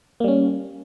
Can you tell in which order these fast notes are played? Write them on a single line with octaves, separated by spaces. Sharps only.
A#3 G3 C#4